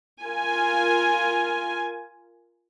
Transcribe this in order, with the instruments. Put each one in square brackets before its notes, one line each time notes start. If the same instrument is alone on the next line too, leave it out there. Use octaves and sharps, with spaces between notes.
[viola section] F4 A#4 G#5